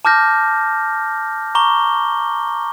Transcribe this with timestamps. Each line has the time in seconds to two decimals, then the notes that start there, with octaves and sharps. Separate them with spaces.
0.05 A5 D6 F6 G6 A#6
1.55 A#5 C#6 D6 G7